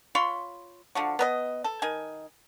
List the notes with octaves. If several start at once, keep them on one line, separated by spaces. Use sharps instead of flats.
F4 C#5 B5 C6
D3 F3 F#4
B3 A#4 D#5
A4
D#3 G#5